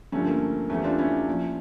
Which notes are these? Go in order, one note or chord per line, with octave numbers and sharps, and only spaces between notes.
G2 D3 F3 A3 C#4
A#3
E2 E3 G3 A3 C#4
D4 F4
C#4 E4
A#2 F3